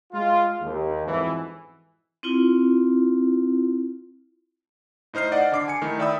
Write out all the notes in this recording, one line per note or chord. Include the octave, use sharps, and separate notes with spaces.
G#3 F4
D#2
F2 G#2 B2 E3
C4 E4 F4
A2 D#4 C5 F6 C7
D5 D#5 F#5
D3 D6 C7
G#5 D6 C#7
D#3 A3 E4
D5 E5 G5 B5 D#6 E6